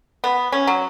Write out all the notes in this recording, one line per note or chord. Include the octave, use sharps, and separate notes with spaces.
B3
C#4
F#3